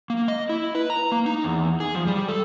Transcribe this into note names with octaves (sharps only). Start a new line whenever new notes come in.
A#3
D#5
E4
B4
A#5
A#3
D#4
E2
G#4
F3
G3
A4